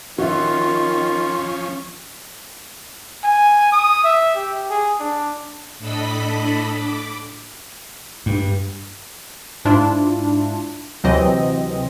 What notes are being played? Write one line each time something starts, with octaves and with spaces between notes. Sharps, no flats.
D#3 F3 C#4 F4 F#4 E5
G#5
D#6
E5
G4
G#4
D4
A2 D4 A4 D#5 B5 B6
D6
G2
G#2 D4 E4 F4
D2 C3 E3 F#3 C4 D#5